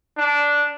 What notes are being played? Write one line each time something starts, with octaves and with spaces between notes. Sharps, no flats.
D4